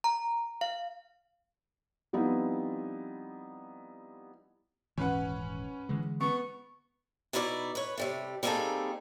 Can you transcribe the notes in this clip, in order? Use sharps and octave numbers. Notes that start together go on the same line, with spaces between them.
A#5
F5
F3 G3 B3 C4 D#4 E4
D#1 G#2 E3 C#4 B4 F#5
D3 E3 G#3
B3 C#6
B2 D#4 E4 C5 D5
B4 C#5
C3 G3 A3
G3 A#3 C4 D#4 G#4 A4